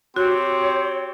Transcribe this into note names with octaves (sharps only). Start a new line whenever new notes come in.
C4 F#4 G4 C#5